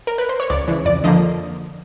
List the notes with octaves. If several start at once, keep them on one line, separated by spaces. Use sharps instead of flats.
A#4
B4
C5
C#5
C#2 D5
C#3 E3
F2 D5
D3 F3 A#3 D#5